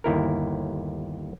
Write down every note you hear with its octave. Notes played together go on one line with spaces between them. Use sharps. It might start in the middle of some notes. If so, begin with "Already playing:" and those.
G1 D#2 E4 A#4